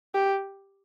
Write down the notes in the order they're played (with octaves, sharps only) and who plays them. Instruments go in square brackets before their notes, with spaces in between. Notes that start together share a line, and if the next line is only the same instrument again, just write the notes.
[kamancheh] G4